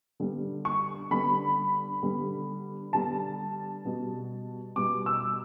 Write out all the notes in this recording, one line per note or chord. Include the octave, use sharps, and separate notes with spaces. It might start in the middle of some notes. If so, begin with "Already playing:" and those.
D3 G3 B3
C#6
D3 G3 B3 B5
D3 G3 B3
D3 G3 B3 A5
B2 G3 B3
B2 G3 B3 D6
E6